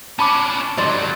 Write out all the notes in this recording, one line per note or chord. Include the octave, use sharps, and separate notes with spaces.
C#4 D4 A5 B5 D6
D2 G2 F#3 D5 C6